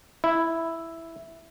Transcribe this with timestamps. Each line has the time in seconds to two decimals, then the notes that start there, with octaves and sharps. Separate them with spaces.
0.24 E4